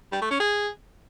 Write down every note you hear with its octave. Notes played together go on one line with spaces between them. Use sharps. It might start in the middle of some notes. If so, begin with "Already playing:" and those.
G3
A3
C#4
G#4